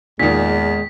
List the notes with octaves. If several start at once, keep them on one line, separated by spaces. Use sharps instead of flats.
E2 A#2 D#3 G#3 B6